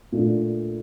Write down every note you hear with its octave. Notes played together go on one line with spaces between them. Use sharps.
A#2 A3 D4